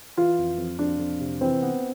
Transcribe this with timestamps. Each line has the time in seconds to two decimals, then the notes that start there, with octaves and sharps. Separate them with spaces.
0.17 E3 F4
0.38 F2
0.58 F2
0.79 F2 D4
1.00 F2
1.20 C3
1.41 E3 C4
1.63 B3